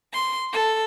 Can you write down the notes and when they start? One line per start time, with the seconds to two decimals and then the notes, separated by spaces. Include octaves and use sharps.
0.12 C6
0.52 A4